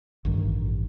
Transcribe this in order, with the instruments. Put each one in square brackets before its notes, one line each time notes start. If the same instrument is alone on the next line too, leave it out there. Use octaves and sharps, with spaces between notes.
[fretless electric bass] A1 G2 D#3